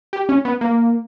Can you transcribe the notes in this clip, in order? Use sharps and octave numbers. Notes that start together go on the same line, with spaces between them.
G4
C#4
B3
A#3